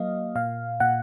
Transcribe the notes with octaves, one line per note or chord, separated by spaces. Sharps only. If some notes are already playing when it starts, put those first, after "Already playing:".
Already playing: F#3 A#3 D#5 F5
A#2 F5
A#2 F#5